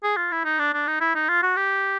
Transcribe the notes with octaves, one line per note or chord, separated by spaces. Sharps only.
G#4
F4
E4
D#4
D4
D4
D#4
E4
D#4
F4
F#4
G4